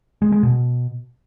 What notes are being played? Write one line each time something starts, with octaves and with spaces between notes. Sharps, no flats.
G#3
G#3
B2